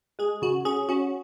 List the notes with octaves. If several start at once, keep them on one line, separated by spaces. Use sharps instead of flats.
G#3 G#4
C#3 F#4
C#4 G#4
C#4 F#4